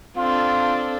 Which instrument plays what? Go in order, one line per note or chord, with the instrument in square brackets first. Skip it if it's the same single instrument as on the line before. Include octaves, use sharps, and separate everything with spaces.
[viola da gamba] C4 D4 A4 [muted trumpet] F4